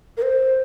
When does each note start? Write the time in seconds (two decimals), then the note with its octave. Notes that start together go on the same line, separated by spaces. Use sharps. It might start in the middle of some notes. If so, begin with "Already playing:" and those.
0.17 A#4
0.22 C5